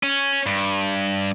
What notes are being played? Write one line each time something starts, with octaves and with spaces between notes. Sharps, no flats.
C#4
G2